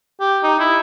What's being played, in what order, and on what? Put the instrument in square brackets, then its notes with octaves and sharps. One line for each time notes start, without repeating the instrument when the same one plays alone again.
[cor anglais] G4
D#4
E4